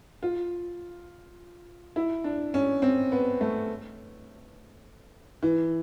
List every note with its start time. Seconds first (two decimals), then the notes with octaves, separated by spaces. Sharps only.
0.23 F4
1.96 E4
2.24 D4
2.54 C#4
2.82 C4
3.12 B3
3.41 A3
5.43 E3